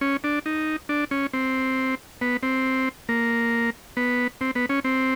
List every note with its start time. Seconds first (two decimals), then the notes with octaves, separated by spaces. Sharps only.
0.01 C#4
0.24 D4
0.46 D#4
0.89 D4
1.11 C#4
1.33 C4
2.21 B3
2.43 C4
3.09 A#3
3.97 B3
4.41 C4
4.55 B3
4.69 C#4
4.84 C4